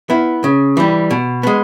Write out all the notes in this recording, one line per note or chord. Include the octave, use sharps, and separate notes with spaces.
B3 E4
C#3
E3 G3
B2
G#3 B3